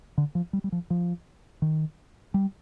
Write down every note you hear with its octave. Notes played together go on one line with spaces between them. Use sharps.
D3
F3
G3
G3
F3
F3
D#3
G3